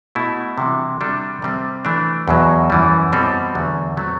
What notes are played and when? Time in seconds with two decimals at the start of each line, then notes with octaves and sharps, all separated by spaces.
0.15 B2 A3 E4 A4
0.58 C3 E3 G3 D4 F#4
1.01 C3 G3 D4 F#4 A4
1.42 C3 G3 C4
1.85 E3 A3 D4
2.28 E2 B2 F#3
2.70 F#2 E3 G3
3.13 B2 G3 C4 F#4 A4
3.55 E2 D3 F#3 A3
3.97 F#3 A3 C4 F#4